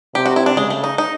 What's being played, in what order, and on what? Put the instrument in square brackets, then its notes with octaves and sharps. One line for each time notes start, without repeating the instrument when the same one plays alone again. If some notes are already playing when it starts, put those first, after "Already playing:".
[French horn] C3 [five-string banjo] G4
[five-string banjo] F#4
E4
D4
[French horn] C#3 [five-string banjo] G#3
[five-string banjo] A3
D#4
D#4